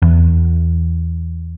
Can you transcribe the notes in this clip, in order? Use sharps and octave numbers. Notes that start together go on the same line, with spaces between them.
E2